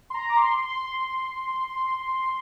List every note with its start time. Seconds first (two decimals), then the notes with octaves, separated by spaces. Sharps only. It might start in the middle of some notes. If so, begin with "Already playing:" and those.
0.10 C6
0.14 A#5
0.29 D6
0.37 C6
0.57 C6